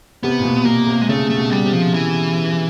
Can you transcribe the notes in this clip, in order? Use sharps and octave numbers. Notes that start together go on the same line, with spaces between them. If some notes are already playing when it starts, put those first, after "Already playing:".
C3 B3
A#2
B2
B2 A#3
C3
G#3
C#3 A3
A3
B2
G3
C3
F3
E3